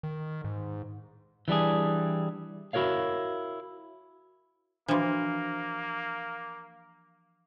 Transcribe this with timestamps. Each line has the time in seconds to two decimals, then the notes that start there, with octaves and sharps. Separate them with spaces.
0.03 D#3
0.44 G#2
1.48 E3 G3 D4 G#4
2.73 E4 F#4 A#4 C#5 F5
4.88 E3 F3 A#3 D4 F#4